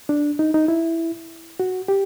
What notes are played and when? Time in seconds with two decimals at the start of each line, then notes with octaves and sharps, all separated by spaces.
0.09 D4
0.39 D#4
0.54 D#4
0.68 E4
1.60 F#4
1.88 G4